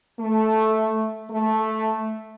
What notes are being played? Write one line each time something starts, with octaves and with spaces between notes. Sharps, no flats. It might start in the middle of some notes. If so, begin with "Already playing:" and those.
A3
A3